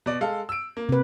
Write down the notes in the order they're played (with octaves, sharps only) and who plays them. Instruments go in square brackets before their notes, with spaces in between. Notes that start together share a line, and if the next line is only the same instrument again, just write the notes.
[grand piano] B2 D5
G#3 A4 F5
E6 D7
A#3
[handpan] C3 B4